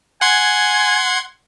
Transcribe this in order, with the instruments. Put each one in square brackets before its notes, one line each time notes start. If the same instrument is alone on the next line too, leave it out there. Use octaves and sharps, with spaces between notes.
[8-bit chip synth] F#5 C6 G#6 [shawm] G#5